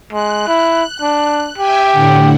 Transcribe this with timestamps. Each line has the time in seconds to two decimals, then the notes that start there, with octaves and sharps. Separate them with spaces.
0.13 G#3 F#6
0.48 E4
1.02 D4
1.58 G4 E5 G5 G#5
1.91 A2 D3 F#5